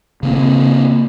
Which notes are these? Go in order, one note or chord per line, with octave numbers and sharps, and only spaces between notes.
C#3 A#3 C4